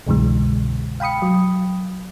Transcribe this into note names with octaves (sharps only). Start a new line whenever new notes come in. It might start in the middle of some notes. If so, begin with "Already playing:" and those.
C2 F#2 B2 D3 E3 G#3
F5 G5 B5 D#6 C#7
F#3